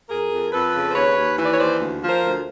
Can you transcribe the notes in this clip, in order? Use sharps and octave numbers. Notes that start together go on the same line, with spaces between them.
F2 G#4 A#4
F2
F2 A4 B4
C#3
C5
D#2 B4 C#5
D#2
E3
D5
C#5
D#2 C5 D5
D2
F3
A#4 C5
D2